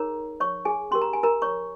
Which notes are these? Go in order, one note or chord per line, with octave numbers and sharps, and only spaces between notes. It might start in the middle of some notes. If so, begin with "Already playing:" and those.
Already playing: D#4 G#4 A#4 C#5 A#5
C#5 C#6
G#4 G#5
C#4 G4 A#4 C6
A#5
G#5
A#4 A#5
C#5 C#6